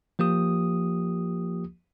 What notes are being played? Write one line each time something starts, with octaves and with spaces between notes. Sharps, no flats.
F3 A#3 G4 D#6